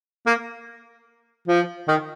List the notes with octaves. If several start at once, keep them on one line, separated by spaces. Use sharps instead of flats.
A#3
F3
D#3